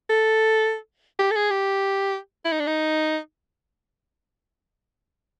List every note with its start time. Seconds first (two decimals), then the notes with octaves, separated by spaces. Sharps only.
0.10 A4
1.19 G4
1.31 A4
1.36 G#4
1.50 G4
2.45 E4
2.52 D#4
2.60 D4
2.67 D#4